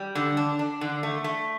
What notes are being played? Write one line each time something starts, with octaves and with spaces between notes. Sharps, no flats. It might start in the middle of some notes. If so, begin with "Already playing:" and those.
Already playing: G3
D3
D4
D4
D3
A3
A3